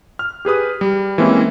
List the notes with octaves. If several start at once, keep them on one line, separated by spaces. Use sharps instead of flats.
F6
G4 G#4 B4 D#6
G3
E3 G#3 A#3 C4 C#4 E4